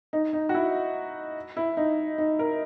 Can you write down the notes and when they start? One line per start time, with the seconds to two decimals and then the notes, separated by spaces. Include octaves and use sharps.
0.13 D#4
0.33 D#4
0.49 F#4
0.54 E4
1.57 E4
1.77 D#4
2.18 D#4
2.39 A#4